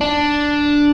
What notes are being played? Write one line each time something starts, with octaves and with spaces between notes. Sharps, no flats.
D4